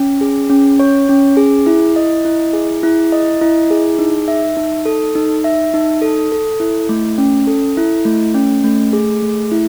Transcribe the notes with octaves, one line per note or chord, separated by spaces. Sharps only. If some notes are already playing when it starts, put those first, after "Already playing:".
Already playing: C#4
G#4
C#4
C#5
C#4
G#4
E4
D#5
E4
G#4
E4
D#5
E4
G#4
D#4
E5
D#4
A4
D#4
E5
D#4
A4
A4
E4
A3
C#4
A4
E4
A3
C#4
A3
G#4
A3
E4